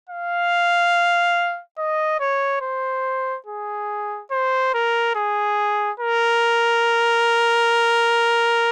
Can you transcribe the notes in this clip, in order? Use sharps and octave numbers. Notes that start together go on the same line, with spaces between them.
F5
D#5
C#5
C5
G#4
C5
A#4
G#4
A#4